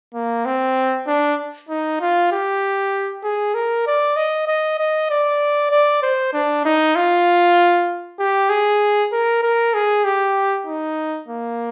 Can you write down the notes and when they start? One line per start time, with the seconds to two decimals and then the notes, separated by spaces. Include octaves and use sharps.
0.14 A#3
0.45 C4
1.07 D4
1.69 D#4
2.01 F4
2.32 G4
3.24 G#4
3.54 A#4
3.87 D5
4.16 D#5
4.47 D#5
4.79 D#5
5.10 D5
5.71 D5
6.02 C5
6.33 D4
6.65 D#4
6.95 F4
8.19 G4
8.49 G#4
9.12 A#4
9.43 A#4
9.74 G#4
10.05 G4
10.67 D#4
11.28 A#3